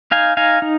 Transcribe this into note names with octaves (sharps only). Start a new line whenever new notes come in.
D#4 F5 G#5
D#4 F5 G#5
D#4